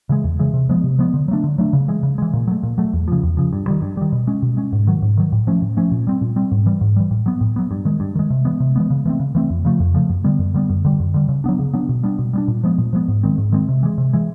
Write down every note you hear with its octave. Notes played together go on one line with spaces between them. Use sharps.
C#3 E3 G#3
E2
C#3 E3 G#3
C3
F3 G#3 B3
C3
F3 G#3 B3
D3
F#3 A3 D4
D3
F#3 A3 D4
C#3
E3 G#3
C#3
E3 G#3
A#2
F#3 A3
A#2
F#3 A3
E2
C#3 F3
E2
C#3 F3
G2
D#3 G3
G2
D#3 G3
B2
G#3 C#4
B2
G#3 C#4
G#2
D#3 F#3
G#2
D#3 F#3
A2
F3 A3 C#4
A2
F3 A3 C#4
A#2
G3 C4
A#2
G3 C4
G#2
E3 G3
G#2
E3 G3
A2
F#3 B3
A2
F#3 B3
G2
D#3 G#3
G2
D#3 G#3
C3
E3 G#3 B3
C3
E3 G#3 B3
C#3
E3 A3 C4
C#3
E3 A3 C4
F2
C#3 F3 A3
F2
C#3 F3 A3
F#2
D3 G3 B3
F#2
D3 G3 B3
F#2
D3 G3
F#2
D3 G3
C#3
F#3 B3 D4
C#3
F#3 B3 D4
B2
G3 B3 D4
B2
G3 B3 D4
A#2
F3 G#3 B3
A#2
F3 G#3 B3
G#2
D#3 G#3 C4
G#2
D#3 G#3 C4
C3
E3 G#3
C3
E3 G#3